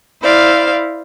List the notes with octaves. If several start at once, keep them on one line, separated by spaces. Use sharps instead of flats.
E4 C5 D5 F5